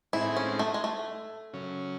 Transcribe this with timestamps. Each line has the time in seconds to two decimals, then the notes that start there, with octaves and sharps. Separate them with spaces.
0.13 A2 G#3 C4 D#4 E4 G#4
0.37 C#4
0.59 A3
0.74 G#3
0.84 A3
1.53 C#3 F#3 C#4